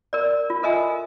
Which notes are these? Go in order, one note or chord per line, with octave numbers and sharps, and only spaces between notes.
A#4 D5
F4
A4 A#4 D#5 E5 G#5